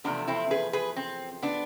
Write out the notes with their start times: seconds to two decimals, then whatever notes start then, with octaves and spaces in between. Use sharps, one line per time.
0.04 E2 C3 F3 A3 B3 D4
0.27 C4 E4
0.51 G#4 B4
0.73 G#4 B4
0.96 C4
1.42 B3 D4